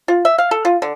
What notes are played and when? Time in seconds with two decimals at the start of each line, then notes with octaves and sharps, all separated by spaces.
0.08 F4
0.25 E5
0.38 F5
0.51 A4
0.65 F4
0.82 D3